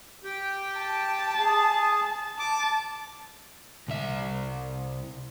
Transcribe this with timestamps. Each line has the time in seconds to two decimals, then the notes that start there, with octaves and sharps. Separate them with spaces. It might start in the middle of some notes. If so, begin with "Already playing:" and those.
0.24 G4 G5
0.78 A5
1.39 G#4
2.39 A5 D6
3.88 C2 E5